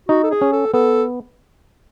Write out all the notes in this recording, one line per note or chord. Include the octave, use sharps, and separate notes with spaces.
D#4 F#4
A4
G#4
C#4
A4
B3 A4